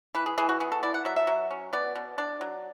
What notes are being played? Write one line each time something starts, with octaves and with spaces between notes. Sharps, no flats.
E3 B4
G#4
E3 G#4
F#4
B3 G#4
A4
E4 D5
F#5
F#3 E5
E5
F#3
C#4
B3 D5
B2
D4 D5
F#3